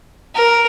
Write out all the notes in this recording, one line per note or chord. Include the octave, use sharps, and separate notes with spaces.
A#4